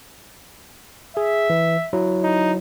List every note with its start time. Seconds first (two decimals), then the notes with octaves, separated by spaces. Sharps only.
1.17 G#4 E5
1.50 E3
1.93 F#3 E4
2.23 D#4